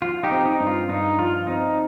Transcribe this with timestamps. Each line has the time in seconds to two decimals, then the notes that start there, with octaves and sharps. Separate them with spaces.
0.01 F3 F4
0.23 D#4 G4
0.31 C4
0.46 D#4
0.60 G2
0.67 F4
0.89 G2 D#4
1.19 F3 F4
1.47 C4 D#4